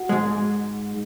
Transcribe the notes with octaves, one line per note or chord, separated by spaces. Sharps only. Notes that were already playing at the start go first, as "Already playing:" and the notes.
Already playing: F#4
G#2 G#3